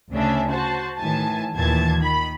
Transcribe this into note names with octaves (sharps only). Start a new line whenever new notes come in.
D2 C#3 C#4 D4 E5
F#4 C5 A5
A2 D#3 E3 G#5 A5
D#2 A#2 E3 A5 G#6
D#3 B5